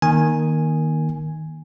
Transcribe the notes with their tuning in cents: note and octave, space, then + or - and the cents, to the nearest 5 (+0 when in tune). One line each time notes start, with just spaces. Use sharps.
D#3 +0 A#3 +20 G#5 +0